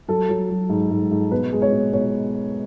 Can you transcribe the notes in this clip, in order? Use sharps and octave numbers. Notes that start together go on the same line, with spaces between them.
F#3 A4
F#3
F#3
G#2
G#2
G#2
B2 B4
G#3
C#5
B2
B2 C#5